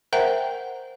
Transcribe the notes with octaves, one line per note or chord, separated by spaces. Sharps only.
A#4 C5 E5 F#5 G5 A#5